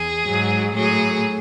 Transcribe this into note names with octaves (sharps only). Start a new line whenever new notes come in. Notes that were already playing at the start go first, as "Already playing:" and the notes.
Already playing: E2 G#4
G#2 F#3
A2 F#3 G#4